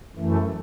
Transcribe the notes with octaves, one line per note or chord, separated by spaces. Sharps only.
F#2 E3 A3